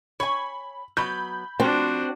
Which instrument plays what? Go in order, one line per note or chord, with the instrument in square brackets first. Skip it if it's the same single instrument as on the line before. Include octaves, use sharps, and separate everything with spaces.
[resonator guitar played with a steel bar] C#5 G#5 [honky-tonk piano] B5
[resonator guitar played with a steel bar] F#3 B3 [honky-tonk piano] B5 G6
[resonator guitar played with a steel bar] F3 [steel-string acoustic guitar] C4 [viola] D4 F#4